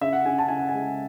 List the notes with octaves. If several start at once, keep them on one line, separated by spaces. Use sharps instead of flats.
C#3 E5
F#5
C#3 G#5
A5
C#3 G#5
F#5
G#5
G#3